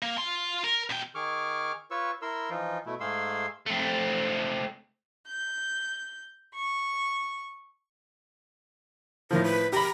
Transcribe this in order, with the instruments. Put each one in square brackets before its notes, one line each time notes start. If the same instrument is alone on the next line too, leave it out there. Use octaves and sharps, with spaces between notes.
[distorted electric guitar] A#3
F4 C6
A#4
B2 G5
[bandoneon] D#3 G#4 C#6 D6 F6
F4 B4 C#5 C#6 E6
E4 A#4 C6 E6
E3 F3 D#4 F4
B2 A3 E4
G#2 A3 G#4 F5 C6 E6
[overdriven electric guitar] A3 C4
[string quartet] G6
C#6
[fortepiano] A2 D#3 F3 [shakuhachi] A#4
[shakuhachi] B4
[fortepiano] G4 B5 [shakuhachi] A#5